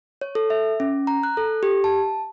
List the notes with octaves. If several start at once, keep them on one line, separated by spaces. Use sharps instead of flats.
C#5
A4
E5
C#4
A#5
F#6
A4
G4
A5